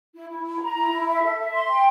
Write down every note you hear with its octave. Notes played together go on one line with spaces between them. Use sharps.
E4
E4
E4
A#5
E4
E4
E5
A4
E5
C6
G5